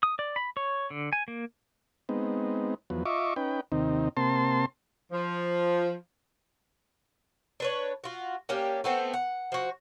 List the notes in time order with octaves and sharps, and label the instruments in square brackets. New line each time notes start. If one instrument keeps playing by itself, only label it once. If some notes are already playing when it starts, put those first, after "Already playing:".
[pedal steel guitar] D#6
D5
B5
C#5
D3
G#5
A#3
[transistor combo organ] G#3 B3 C4 D#4
E2 F3 F#3 B3
F4 D#5 E5 C#6 D6
C#4 D#4 B4 G5
D#2 C3 D#3 C4 D#4
C3 A#3 C4 A5 C6
[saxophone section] F3
[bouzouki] D4 B4 C#5
F4 F#4
A#3 C#4 D4 G4
A3 B3 C4
F#5
F3 F#4